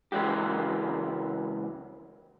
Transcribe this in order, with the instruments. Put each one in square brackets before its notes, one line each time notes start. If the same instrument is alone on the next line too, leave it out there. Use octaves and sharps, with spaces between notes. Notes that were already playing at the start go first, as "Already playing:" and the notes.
[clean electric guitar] C#2 E3 G#3 F#4 G4